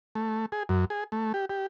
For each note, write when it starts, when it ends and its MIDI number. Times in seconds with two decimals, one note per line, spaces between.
0.15 0.46 57
0.52 0.63 68
0.69 0.85 42
0.90 1.04 68
1.12 1.32 57
1.34 1.45 67
1.49 1.66 67